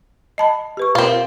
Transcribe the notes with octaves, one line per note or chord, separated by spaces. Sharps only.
D#5 A5 B5
G4 B4 C#6
B2 C4 F4 A#4